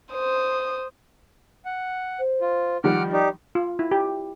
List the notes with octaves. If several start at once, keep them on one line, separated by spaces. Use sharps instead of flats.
C5 D#6
F#5
C5
F4
D#3 F3 G3 F#5 D6 F6
D#4 G4 D5
F4
E4
G4